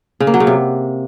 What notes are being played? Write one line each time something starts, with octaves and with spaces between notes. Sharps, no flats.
C#3
A#3
F#3
C#3
C3